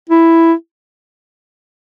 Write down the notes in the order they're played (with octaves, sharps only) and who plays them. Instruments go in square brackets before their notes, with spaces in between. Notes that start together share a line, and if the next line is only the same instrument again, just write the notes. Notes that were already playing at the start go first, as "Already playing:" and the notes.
[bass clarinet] E4